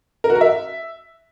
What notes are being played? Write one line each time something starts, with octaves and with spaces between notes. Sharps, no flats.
A#4
F#4
A#4
E5